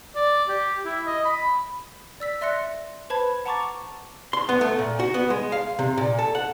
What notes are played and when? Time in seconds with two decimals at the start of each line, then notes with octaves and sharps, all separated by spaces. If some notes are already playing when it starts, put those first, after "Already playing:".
0.16 D5
0.49 G4
0.85 E4
1.06 D#5
1.25 B5
2.20 D5 E6 B6
2.41 D5 E5 C6 F#6 A#6 C#7
3.10 B4 C5 A5 B5 G#6
3.45 F#5 A5 A#5 C#6 D6 A6
4.33 C6
4.49 B3
4.61 A3
4.79 A#2
4.99 F#4
5.14 B3
5.30 G#3
5.52 F5
5.79 C3
5.98 A#2
6.19 A4
6.35 F#5